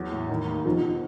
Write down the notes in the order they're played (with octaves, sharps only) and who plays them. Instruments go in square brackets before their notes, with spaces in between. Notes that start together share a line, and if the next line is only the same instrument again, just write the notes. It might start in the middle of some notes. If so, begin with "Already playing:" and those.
Already playing: [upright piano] E2 F#3
A2
D#3
D#2
[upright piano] B2 [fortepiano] F3